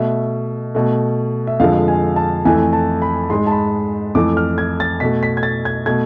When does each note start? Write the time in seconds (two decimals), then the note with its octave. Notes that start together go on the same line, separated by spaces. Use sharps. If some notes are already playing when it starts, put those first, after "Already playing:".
Already playing: B2 A3 E5
0.75 B2 A3
1.47 E5
1.60 F2 D3 F3 G#3 F5
1.88 G#5
2.16 A5
2.45 F2 E3 A3 G#5
2.73 A5
3.02 B5
3.30 G#2 G#3 C6
3.47 A5
3.51 B5
4.15 F2 E3 A3 D6
4.37 F6
4.58 G#6
4.80 A6
5.00 B2 A3 B6
5.23 B6
5.37 G#6
5.43 A6
5.65 G#6
5.86 B2 A3 G#6